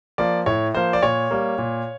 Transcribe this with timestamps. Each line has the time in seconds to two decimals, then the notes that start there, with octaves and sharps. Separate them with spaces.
0.18 F3 A#3 D5
0.46 A2 C#5
0.74 F3 A#3 C5
0.93 D5
1.03 A#2 C#5
1.31 G3 A#3
1.58 A#2